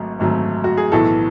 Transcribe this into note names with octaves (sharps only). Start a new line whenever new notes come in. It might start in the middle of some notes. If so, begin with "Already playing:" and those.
Already playing: G#1 G#2 F#3 A3
G#1 G#2 F#3 A3
F#4
G#4
B1 A2 E3 A4